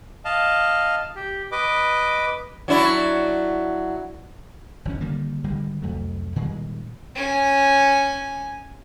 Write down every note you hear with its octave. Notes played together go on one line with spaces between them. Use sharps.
D#5 F5 A5
G4
B4 D#5 D6
F#3 D4 E4
F#1 E3 C#4
D3 D#3 G3 A#3
G#1 D3 G3 G#3
C2 F2 F#3 A3
A#2 D#3 G3 G#3
C#4 G#5